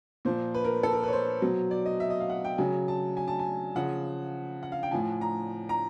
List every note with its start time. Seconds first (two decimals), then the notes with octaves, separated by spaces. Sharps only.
0.25 A#2 F3 C5
0.55 B4
0.64 A#4
0.83 A4
0.93 A#4
1.03 B4 C#5
1.13 C5
1.41 B2 F#3
1.71 D5
1.86 D#5
2.00 E5
2.10 D#5
2.20 F5
2.30 F#5
2.45 G5
2.58 C#3 F#3 G#5
2.88 A5
3.17 G#5
3.28 A5
3.39 G#5
3.75 C#3 F3 F#5
4.63 F#5
4.72 F5
4.83 G5
4.91 A2 F3 G#5
5.21 A#5
5.69 A#5